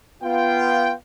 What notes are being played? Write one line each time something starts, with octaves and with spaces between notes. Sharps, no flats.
B3 F4 G5